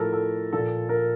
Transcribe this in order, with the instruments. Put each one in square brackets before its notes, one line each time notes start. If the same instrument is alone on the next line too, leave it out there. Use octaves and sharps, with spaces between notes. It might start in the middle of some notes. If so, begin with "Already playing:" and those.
Already playing: [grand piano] A2 F3 A4 A#4
A4
A#2 F3 A4
A#4